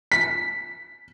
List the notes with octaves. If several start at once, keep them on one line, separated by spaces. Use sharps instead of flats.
B6